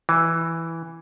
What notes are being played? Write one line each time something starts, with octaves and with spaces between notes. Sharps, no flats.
E3